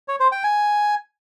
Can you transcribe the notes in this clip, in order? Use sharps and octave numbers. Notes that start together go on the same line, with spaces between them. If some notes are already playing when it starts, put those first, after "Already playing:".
C#5
C5
G5
G#5